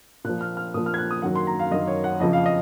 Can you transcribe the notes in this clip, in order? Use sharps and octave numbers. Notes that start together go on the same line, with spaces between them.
A#2 F3 F#6
F6
F6
A#2 F3 D#6
F6
G#6
F#6
D#6
F#2 D#3 F#3 F#5
C6
A#5
F5
F#2 D#3 F#3 D#5
C#5
F#5
F2 C#3 F3 D#5
F5
D#5